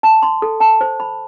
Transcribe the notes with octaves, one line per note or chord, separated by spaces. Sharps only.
A5
C6
A4
A5
C5
B5